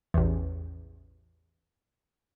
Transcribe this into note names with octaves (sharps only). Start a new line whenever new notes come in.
A1 E2